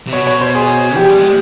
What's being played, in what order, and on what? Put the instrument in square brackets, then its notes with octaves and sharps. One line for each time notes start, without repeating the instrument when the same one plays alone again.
[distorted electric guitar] C3
[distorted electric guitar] B2 [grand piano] C#5
[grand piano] C#5
C5
G#4
[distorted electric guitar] F3 [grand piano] G4
[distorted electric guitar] G3
G#3